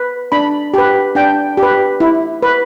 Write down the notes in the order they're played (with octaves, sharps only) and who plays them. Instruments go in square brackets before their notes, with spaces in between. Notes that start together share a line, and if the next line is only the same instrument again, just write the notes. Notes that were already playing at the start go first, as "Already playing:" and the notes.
Already playing: [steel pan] B4
D4 B5
G4 B4
D4 G5
G4
B4
E4
B4